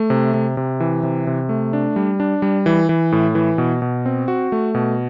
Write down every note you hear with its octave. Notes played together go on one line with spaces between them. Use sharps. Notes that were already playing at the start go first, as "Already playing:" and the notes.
Already playing: A3
C3
C3
C3
E3
C3
C3
A3
D4
G3
D4
G3
E3
E3
A2
E3
B2
B2
C4
F#4
A3
B2